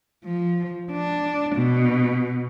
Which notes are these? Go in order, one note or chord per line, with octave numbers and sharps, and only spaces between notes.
F3
D4
B2